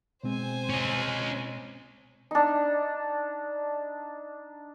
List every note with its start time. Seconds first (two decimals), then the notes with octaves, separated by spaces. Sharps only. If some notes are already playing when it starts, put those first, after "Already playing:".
0.24 B2 G#3 C4 C5 G#5
0.70 C#4 D#5
2.31 D4 D#4